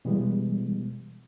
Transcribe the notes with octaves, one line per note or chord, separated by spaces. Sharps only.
B2 E3 G3 G#3 B3